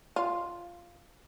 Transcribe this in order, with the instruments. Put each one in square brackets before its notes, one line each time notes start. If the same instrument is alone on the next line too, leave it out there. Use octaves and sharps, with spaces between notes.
[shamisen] F4